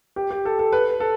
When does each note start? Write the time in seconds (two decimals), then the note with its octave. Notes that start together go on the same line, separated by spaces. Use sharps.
0.16 G4
0.31 G4
0.45 A4
0.59 A4
0.72 B4
1.00 A4